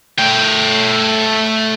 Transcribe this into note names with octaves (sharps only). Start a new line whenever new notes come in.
A3 G5